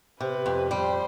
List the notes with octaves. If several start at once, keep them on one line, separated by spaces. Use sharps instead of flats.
C3 B4
F2
G3 C5